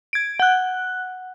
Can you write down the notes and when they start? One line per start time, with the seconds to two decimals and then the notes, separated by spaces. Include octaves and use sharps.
0.13 G#6 D7
0.40 F#5 F#6